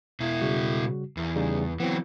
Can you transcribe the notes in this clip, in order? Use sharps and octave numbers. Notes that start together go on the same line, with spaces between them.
B2 E4
C#3 G3 F#4
E2
C#3 G3 D#4
E3 F#3 B3 C4